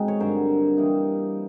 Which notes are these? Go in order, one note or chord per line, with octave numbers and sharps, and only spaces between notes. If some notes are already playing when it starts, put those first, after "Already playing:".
Already playing: G#2 B2 G#3 C4 D#4
C#5
G2 D3 F#3 A#4 C5
E3 G3 A#3 D#4